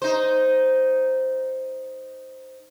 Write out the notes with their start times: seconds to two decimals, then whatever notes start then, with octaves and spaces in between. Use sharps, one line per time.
0.02 D#4 C5